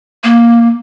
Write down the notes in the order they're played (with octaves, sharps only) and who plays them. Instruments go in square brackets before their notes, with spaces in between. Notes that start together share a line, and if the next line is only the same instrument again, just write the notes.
[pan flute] A#3